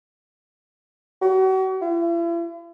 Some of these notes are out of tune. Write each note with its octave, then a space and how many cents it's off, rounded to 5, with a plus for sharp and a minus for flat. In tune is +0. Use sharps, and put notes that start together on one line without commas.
F#4 +40
E4 +45